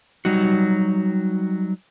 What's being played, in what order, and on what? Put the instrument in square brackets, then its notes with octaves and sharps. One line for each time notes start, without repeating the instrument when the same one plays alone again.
[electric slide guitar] F#3 G3 D#4 F#4